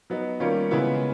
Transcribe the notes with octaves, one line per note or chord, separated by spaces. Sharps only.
F#3 B3 D#4
D#3 G3 A#3 C#4 F4
C#3 E3 G#3 B3 E4